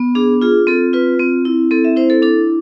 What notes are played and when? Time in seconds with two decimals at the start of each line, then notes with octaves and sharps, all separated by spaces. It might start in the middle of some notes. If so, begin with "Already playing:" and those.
Already playing: B3
0.15 D4 G#4
0.41 F4 G#4
0.67 C4 A4
0.93 F4 B4
1.19 C4
1.45 E4
1.71 C4 A4
1.85 E5
1.97 E4 C5
2.10 A4
2.22 D4 A4